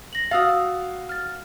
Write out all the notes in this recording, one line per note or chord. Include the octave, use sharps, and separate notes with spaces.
A#6 F#7
F#4 F5 D#6 E6 A6
F6 A6